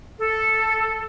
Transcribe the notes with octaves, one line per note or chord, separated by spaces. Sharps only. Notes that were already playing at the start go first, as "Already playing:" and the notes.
A4